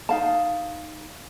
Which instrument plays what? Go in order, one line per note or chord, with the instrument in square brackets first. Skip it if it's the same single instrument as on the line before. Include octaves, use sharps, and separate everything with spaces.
[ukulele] D#4 F5 A5